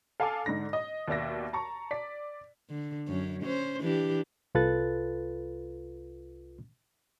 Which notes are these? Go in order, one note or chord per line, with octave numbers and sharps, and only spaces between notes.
A4 F5 G#5 A5 D6
G#2 D3 D#4 A#6
D#5
D#2 B2 D5 E5 A#6
A5 A#5 C#6
D5 B6
D3
F#2 C#4
C#4 C5
E3 D4 G4
C2 F4 A4 B4 F#6 A6